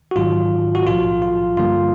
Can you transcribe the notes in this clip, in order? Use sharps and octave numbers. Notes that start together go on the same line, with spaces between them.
F#4
A1 G#2 D#3 F#3 F4
F#4
B1 A2 F3 F4
F4
G2 D3 G3 A#3 F4